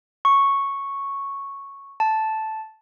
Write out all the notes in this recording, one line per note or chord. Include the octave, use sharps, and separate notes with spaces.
C#6
A5